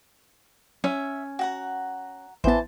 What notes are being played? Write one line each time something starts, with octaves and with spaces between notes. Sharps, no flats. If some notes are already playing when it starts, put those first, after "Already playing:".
C#4 E5
F#4 F#5 A#5
A1 E3 B3 C5 A5